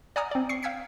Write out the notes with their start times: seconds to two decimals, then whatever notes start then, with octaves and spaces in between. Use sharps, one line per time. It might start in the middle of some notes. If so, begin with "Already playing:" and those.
0.16 D5 F#5 G#5 A#5 D#6 F6
0.31 C4 D5
0.49 C#6 D#6 C7 C#7
0.63 F5 G5 E6 G#6 B6 C#7